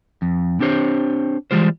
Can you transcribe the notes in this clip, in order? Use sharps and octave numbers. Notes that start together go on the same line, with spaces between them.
F2
C4 D4 G4 C5 C#5
E3 G3 G#3 F4 C5